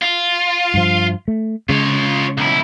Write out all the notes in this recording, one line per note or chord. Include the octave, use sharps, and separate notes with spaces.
F4
G2 F3
A3
C#3 G#3 F4 C#5
B1 E4